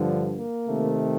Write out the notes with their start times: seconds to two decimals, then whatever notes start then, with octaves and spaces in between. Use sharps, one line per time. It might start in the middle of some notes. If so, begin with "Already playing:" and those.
Already playing: G2 D3 F3
0.36 A#3
0.68 C3 D#3 A3